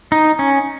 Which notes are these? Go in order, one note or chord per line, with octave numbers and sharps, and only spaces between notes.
D#4
C#4